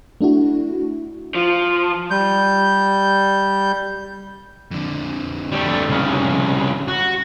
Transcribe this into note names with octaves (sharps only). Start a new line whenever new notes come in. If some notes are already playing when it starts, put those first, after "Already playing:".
A3 D4 E4 F#4
F3
G3 G6
F2 D3
G3 A3
C2 C#3
F#4